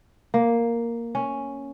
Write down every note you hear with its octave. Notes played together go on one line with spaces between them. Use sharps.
A#3
C#4